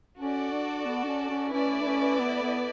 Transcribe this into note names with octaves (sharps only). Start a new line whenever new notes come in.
C#4 F#4 A4 D5
D4
B3
D4
C#4
C#4
A3 C#4 E4 B4 D5
D4
C#4
B3
B3